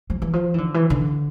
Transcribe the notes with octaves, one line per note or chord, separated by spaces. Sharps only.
F3
E3
F3
E3
D3
E3
D3